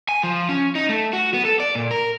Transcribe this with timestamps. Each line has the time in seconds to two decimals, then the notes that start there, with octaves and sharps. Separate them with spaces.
0.09 G#5
0.23 F3
0.49 C#4
0.75 D#4
0.89 A3
1.13 F#4
1.34 B3
1.45 A4
1.60 D5
1.75 A#2
1.91 A#4